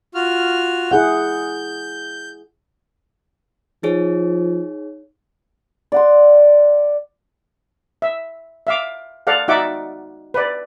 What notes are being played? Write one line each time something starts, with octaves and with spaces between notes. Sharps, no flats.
F4 F#4 F6
E4 G#4 F#5 G6
F3 D#4 G#4 C#5
D5 F#5 C6
E5
E5 F5 D6
A4 D5 F5 F#5
D#4 F#4 D5 E5 F#5 D6
B4 D5